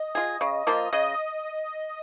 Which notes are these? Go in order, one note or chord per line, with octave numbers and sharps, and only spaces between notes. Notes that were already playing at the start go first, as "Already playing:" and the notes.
Already playing: D#5
F4 G#4
C#3
F3 A#3 F4
C#3 D#5